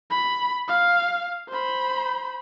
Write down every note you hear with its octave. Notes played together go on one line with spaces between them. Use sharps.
B5
F5
C5 B5